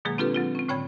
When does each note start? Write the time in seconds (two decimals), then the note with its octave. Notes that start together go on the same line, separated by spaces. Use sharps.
0.05 B2 D#3 F#3 G#3 A#3 G#4
0.18 C4 D4 F4 G4 A4 B4
0.34 F#3 C4 F4
0.55 C4 C#4
0.68 A2 D3 C#5 G5 B5 G#6